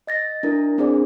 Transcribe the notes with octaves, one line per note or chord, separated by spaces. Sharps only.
D#5 A6 A#6
D4 E4 A#4
C4 D4 G#4 C5 D5